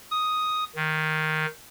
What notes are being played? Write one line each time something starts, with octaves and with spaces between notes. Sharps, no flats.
D#6
D#3